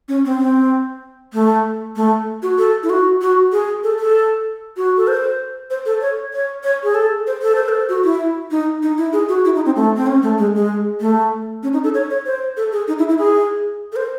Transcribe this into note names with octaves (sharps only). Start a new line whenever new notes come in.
C#4
C4
C4
A3
A3
F#4
A4
E4
F#4
F#4
G#4
A4
A4
F#4
A4
C5
C5
A4
C#5
C#5
C#5
G#4
A4
C5
A4
C5
A4
F#4
E4
D#4
D#4
E4
G#4
F#4
E4
D#4
C4
A3
C4
C#4
A3
G#3
G#3
A3
C#4
D#4
A4
C#5
C#5
C5
A4
G#4
D#4
E4
E4
G#4
A4
C5